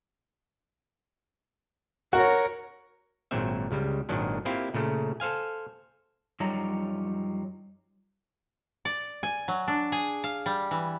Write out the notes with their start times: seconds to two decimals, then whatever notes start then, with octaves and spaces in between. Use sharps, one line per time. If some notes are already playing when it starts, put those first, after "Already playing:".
2.13 F#4 A#4 C#5
3.31 G#1 A#2 F#3 C4 E5
3.71 C#2 C#3 G3
4.09 G#1 A#2 D#3 F#3 D4
4.45 A#3 C4 E4 F4 G4
4.74 A#2 C#3 A3
5.20 A4 C5 F5 G#5
6.40 F#2 F3 G3 D#4 C#5 A#5
8.85 D5
9.23 G#5
9.48 F#3
9.68 D4
9.92 G#4
10.24 F5
10.46 G3
10.71 E3